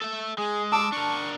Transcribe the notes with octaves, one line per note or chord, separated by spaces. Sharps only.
A4 E5
G#3 G#4
A5 D6 E6
D4 A#4 C#6